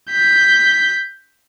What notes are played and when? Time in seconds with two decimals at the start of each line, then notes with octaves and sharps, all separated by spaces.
0.11 G6 B6